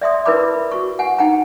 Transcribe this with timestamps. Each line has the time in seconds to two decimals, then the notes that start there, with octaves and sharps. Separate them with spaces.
0.01 D5 E5 C6 D#6
0.25 E4 A#4 B4 D5 B5 D6
0.72 F#4 C#6
0.99 F#5 G#5
1.18 D#4 F#5 G5 A#5